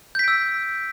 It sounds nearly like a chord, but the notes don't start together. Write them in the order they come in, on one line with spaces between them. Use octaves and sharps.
G6 B6 D7 E6